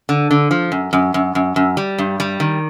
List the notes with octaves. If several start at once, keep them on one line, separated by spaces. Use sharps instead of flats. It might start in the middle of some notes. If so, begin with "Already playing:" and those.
D3
D3
F3
F#2
F#2
F#2
F#2
F#2
G3
G2
G3
D#3